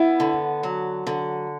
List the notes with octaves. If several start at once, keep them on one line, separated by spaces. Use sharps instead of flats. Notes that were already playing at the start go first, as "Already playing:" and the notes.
Already playing: B3 E4
D3
F#3
D3